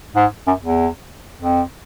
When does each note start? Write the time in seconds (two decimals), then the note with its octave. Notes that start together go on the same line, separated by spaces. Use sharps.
0.16 G#2
0.47 F#2
0.63 E2
1.42 F2